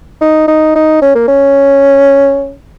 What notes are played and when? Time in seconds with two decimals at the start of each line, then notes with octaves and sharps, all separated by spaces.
0.21 D#4
0.48 D#4
0.75 D#4
1.02 C#4
1.15 A#3
1.28 C#4